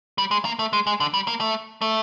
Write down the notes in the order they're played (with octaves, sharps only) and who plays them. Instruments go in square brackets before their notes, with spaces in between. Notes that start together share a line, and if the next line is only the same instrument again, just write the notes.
[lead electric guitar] G3
G#3
A#3
A3
G#3
G#3
D3
G3
A#3
A3
A3